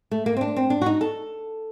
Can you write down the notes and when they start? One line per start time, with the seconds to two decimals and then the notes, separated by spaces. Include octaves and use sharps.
0.11 A3
0.26 A#3
0.37 C4
0.41 D4
0.56 C4
0.70 D4
0.82 F#4
0.86 D#4
1.01 A4